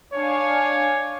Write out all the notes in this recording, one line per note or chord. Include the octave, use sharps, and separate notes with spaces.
D4 C#5 F5 G#5